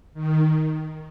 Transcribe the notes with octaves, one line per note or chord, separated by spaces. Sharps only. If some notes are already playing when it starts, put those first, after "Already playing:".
D#3